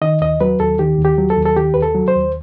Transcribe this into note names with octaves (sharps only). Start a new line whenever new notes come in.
D#3 D#5
D#2 D#5
F#3 B4
D#2 A4
D#3 G4
D#2
G4
F#3
A4
D#2
A4
D#3 G4
D#2 B4
A4
F#3
C5
D#2